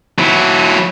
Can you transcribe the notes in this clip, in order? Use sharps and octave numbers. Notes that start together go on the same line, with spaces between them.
F#3 E4